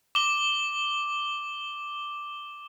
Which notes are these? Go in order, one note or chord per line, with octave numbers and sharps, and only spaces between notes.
D6 G7